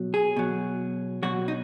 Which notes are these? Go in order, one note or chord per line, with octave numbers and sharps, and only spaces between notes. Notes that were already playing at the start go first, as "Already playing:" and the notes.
Already playing: B2 F#3
G#4
B2 F#3
B2 F#3 F#4
D#4